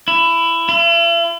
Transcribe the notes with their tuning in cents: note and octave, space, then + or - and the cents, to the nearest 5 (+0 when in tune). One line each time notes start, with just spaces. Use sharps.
E4 +15
E4 +45